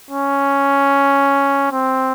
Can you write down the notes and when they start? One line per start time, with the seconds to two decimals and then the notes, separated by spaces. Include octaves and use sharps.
0.11 C#4
1.72 C4